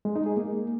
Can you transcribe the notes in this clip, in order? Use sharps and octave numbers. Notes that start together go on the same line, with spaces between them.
G#3
D#4
G#4
A#3